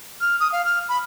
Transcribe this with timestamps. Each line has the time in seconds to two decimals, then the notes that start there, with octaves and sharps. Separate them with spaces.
0.21 F6
0.40 D#6
0.52 F5
0.65 F6
0.89 B5